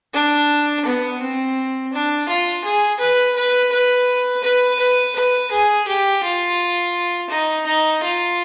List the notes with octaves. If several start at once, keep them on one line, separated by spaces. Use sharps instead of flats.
D4
B3
C4
D4
F4
G#4
B4
B4
B4
B4
B4
B4
G#4
G4
F4
D#4
D#4
F4